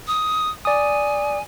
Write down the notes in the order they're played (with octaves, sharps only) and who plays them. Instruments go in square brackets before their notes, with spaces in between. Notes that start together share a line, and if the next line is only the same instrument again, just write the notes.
[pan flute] D#6
[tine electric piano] D5 D#6 [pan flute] G#5